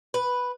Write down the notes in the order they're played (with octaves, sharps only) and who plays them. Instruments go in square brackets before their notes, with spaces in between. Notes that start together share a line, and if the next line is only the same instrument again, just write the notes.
[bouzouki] B4